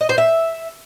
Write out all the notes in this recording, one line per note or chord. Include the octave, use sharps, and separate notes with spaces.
D#5
C5
E5